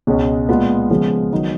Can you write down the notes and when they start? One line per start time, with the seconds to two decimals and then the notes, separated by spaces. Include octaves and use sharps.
0.07 C#2 B2 G#3 C#4
0.48 A#2 G#3 B3 F4
0.91 C#3 F3 G#3 B3 F4
1.32 D#3 F#3 B3 D#4